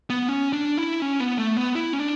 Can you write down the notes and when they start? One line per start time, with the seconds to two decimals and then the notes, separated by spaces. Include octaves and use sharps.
0.10 B3
0.28 C#4
0.53 D4
0.77 E4
1.02 C#4
1.20 B3
1.38 A3
1.57 B3
1.75 E4
1.93 C#4
1.99 D4